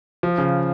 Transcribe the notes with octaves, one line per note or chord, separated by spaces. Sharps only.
F3
C#3